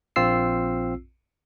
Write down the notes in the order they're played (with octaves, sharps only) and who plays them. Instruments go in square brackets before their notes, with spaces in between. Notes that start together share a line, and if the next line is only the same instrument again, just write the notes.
[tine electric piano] A#1 C4 F4 E6 C7